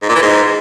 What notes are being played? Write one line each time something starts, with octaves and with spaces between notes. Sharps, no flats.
G#2
A#2
E3
G#2